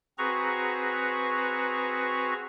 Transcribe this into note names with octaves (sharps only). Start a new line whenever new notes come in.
C4 F#4 G#4 B4 A#5 C#6